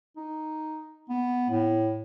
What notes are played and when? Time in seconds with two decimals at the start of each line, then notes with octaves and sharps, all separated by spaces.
0.16 D#4
1.09 B3
1.49 A2